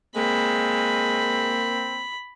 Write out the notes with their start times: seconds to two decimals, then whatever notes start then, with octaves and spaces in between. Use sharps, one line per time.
0.16 G#3 A#3 C4 B5